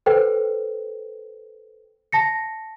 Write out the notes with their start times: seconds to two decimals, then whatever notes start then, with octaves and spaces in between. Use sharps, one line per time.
0.06 A4 B4 C5 G5
2.12 A5 A#6 C#7